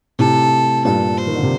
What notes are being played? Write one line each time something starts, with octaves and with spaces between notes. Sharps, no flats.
A2 C3 A4
G2 A#2 A4
C5
D#3
D3
C3